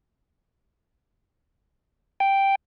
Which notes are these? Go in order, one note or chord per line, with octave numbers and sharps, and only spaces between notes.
G5